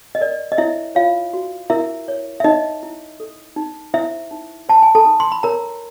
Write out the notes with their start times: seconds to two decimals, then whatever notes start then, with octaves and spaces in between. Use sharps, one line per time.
0.15 D#5
0.21 A#4 D5
0.52 D#5
0.58 E4 C#5 E5
0.95 F4 C#5 F5
1.33 F#4
1.70 E4 A#4 E5
2.08 C#5
2.40 E5
2.44 D#4 C#5 D#5
2.83 E4
3.20 A4
3.56 D#4
3.94 E4 C5 E5
4.31 D#4
4.69 C5 A5
4.82 G#5
4.95 A4 A5
5.06 D#4
5.20 C6
5.32 B5
5.43 A#4 C#5 A#5